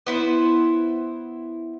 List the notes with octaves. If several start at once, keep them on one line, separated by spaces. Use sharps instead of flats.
B3 E4 C5